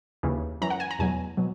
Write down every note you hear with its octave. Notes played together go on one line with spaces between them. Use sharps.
D#2 C#3 E3
F#2 E3 A#5
F#5
G#5
A#5
E2 B2 F#3 G#5
B2 F#3